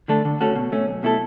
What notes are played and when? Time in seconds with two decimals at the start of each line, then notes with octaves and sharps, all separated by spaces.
0.08 D3 A3 D4 A4
0.25 D3
0.41 A3 C#4 F#4 A4
0.56 B2
0.72 A3 C#4
0.88 B1
1.03 B2 A3 E4 A4